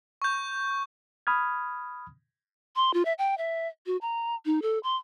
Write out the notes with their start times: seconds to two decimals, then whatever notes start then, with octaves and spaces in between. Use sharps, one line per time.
0.22 C#6 G6
1.27 B5 D#6 F6 G#6
2.76 C6
2.94 F4
3.05 E5
3.18 G5
3.38 E5
3.86 F#4
4.01 A#5
4.46 D#4
4.62 A4
4.83 C6